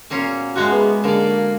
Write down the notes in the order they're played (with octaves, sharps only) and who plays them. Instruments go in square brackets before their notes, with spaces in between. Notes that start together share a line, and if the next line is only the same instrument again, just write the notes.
[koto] A#2 A#3 C#4 [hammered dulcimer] B3 F#4 G#5
[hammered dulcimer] G#2 E5 [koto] F3 G#3 A#3 [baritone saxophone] F#4
[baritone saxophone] B3
[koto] D3 D5 [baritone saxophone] A#3
[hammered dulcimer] F#4